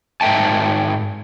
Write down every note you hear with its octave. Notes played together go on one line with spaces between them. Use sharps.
G#2 A#4 E5 G5 A5